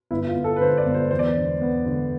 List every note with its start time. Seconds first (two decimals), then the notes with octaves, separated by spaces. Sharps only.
0.11 G1 E4
0.27 F4
0.36 G1
0.44 A4
0.56 B4
0.61 D3 C5
0.77 D5
0.86 G1
0.94 C5
1.11 E2 C5
1.19 D5
1.26 C5
1.37 D3
1.61 B3
1.86 D3